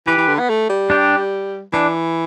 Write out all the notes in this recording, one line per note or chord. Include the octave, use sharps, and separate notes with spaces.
E3 G4 B4
E3
D3
B3
A3
G3
D4 G4
E3 D4